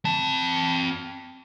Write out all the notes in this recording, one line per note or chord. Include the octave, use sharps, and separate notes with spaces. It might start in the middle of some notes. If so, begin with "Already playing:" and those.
C4 A5